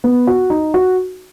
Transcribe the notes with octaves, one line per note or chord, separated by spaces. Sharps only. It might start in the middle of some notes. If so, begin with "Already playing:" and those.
B3
F#4
D#4
F#4